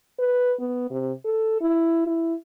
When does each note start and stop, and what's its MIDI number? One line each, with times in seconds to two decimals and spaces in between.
0.19 0.54 71
0.60 0.87 59
0.91 1.11 48
1.25 1.58 69
1.61 2.07 64
2.07 2.34 64